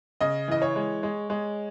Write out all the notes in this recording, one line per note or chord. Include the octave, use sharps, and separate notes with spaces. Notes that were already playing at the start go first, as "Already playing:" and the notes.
C#3 D#5
E3 D#5
C#5
G#3
G#3
G#3